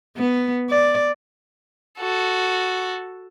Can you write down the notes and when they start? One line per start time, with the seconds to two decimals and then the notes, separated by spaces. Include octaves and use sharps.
0.17 B3
0.70 D5
1.99 F#4 A4